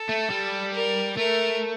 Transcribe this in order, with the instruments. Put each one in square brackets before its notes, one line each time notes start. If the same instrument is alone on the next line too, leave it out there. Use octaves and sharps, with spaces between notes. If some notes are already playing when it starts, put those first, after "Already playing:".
Already playing: [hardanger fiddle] A4
[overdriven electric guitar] A3
G3
[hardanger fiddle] A#4
[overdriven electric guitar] A3 [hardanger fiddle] A#4